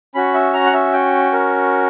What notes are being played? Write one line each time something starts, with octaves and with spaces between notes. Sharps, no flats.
C#4 F#4 B5
E5
A#5
F#5
E5
G5
A#4